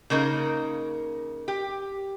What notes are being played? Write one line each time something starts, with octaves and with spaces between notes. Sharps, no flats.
C#3 A#3 D#4 A#4
G4